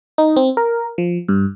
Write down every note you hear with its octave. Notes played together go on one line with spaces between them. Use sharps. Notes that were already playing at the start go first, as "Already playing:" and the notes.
D#4
C4
A#4
F3
G2